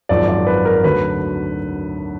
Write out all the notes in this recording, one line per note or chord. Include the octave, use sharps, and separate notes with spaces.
G#1 F#2 F3 D5
D5
B4
A#4
D2 D3 F#3 B4